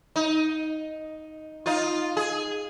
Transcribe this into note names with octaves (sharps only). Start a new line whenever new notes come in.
D#4
D#4 F4
G#4